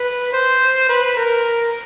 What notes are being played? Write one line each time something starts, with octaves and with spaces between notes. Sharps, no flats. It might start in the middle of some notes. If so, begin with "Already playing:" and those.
Already playing: B4
C5
B4
A#4